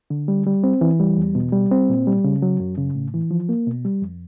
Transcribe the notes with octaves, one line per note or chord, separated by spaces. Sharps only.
D3
G3
G3
C4
E3
G3
E2
B2
G3
C4
A#2
G3
C#3
F#3
F#2
C#3
A2
E3
F3
A#3
B2
G3
F2